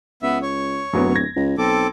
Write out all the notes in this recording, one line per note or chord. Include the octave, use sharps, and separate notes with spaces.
C#2 B3 E5
C#5
D1 F#2 F#3 B3
G#6 A#6
C#2
B1 C4 A4 D6